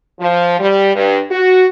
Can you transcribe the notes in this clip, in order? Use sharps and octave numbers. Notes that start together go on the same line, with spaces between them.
F3
G3
G2
F#4